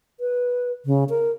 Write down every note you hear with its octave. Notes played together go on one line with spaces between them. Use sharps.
B4
C#3
A#4